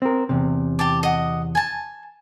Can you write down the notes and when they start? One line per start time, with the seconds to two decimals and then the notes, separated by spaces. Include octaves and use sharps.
0.02 C4 A#4
0.29 E2 C3
0.79 G4 A5 D6
1.03 D#5 F#5
1.55 G#5 A5